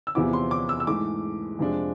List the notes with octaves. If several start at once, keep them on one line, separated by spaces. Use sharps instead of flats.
E6
E2 C3 F3 B3 E4 D6
C6
D6
E6
E6
G#2 E3 A3 D6
F2 C3 F3 G#3 D4